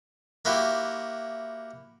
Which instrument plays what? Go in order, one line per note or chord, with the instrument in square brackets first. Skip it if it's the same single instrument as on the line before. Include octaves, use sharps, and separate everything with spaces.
[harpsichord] A#3 E4 F#4 G4